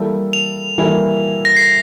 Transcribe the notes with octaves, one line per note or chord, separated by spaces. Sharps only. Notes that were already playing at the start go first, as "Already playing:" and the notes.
Already playing: E3 G3 A#3 E4 A4
F7
E3 G3 A#3 E4 A4
A#6
C7